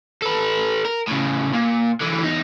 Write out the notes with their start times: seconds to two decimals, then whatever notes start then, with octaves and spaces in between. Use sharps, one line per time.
0.22 A4 B4
0.85 A#4
1.07 A2 C#3
1.53 A#2
2.01 D3 E3
2.22 E2 D#4